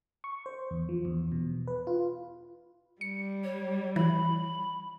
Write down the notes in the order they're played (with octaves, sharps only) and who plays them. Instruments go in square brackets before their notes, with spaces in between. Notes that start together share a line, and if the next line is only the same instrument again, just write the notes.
[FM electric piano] C#6
C5
E2
F3
E2
B2
B4
F4
[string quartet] G3 [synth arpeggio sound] C#7
[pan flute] C#5
[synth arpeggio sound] E3 [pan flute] B5